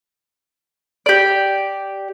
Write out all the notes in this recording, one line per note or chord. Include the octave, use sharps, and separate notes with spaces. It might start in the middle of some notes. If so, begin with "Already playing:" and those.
G4 D5